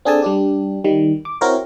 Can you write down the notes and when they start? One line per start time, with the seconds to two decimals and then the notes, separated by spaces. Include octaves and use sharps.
0.05 C4 D4 G#4 A4 G#5 A5
0.22 G3 D4 G4
0.84 D#3 G3
1.25 D6
1.41 C4 E4 F#4 A#4 C5 C#5